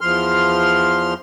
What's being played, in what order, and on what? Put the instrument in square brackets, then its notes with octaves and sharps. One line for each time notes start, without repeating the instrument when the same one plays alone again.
[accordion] E2 F3 C6 F6